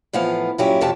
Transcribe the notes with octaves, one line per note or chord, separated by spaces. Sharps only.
A2 E3 F3 B3 F5
G2 A#2 F#3 C#4 E4 G4
F2 C3 F#3 G4 A5